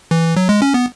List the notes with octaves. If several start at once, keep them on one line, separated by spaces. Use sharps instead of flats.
E3
F#3
G#3
C#4
B3